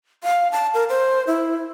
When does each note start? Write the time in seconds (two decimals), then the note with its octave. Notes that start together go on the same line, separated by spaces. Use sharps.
0.24 F5
0.52 A5
0.74 A#4
0.89 C5
1.27 E4